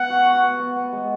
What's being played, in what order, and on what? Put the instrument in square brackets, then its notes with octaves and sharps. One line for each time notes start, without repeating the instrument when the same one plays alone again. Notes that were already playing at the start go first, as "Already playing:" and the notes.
Already playing: [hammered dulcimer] B3 [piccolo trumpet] F#5
[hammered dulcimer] F#4
F#4
B3
B3
B3
G#3